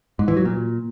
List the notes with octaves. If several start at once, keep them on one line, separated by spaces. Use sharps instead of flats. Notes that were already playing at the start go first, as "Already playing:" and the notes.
G#2
E3
F#3
A#2